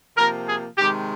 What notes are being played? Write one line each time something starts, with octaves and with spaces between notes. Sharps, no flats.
C3 F3 A#3 A#4
G#4
C3 D#3 G#3 G4